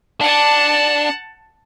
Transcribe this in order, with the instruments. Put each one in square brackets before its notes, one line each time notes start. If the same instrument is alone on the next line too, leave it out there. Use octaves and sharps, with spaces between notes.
[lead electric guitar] D4 [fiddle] F#5 A5